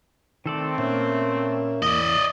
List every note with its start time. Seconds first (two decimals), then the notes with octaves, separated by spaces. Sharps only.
0.46 D#3 A3 C4 A4 D5
0.78 A#2 A#3 C#4 E5
1.83 E2 D5 D#5